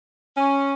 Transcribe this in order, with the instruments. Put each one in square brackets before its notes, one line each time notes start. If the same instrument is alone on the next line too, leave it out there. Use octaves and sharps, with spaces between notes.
[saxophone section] C#4